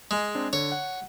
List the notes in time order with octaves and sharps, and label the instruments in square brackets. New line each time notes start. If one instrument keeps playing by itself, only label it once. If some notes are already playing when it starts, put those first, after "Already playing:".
[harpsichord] G#3 [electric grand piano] G#4
[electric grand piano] C4 D4
[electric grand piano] D3 [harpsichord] C#5
[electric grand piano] F#5